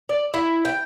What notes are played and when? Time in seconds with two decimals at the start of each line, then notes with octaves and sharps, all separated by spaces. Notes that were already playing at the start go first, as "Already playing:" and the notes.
0.09 D5
0.34 E4
0.65 G5